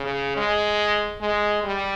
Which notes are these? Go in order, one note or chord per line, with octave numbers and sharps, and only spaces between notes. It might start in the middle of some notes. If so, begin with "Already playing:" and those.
Already playing: C#3
G#3
G#3
G3